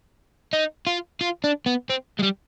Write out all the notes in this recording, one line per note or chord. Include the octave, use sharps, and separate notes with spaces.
D#4
F4
F4
D4
B3
C4
G#3
G3